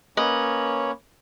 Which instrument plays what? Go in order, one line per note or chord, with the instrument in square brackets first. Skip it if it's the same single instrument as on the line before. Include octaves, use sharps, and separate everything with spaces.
[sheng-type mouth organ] A#3 C#4 C#5 [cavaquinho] B4 D#5